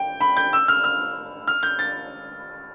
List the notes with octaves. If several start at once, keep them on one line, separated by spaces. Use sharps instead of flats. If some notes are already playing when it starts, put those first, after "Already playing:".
Already playing: G5
B5
G6
E6
F6
F6
F6
G6
A6